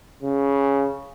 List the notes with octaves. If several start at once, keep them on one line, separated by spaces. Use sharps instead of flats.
C#3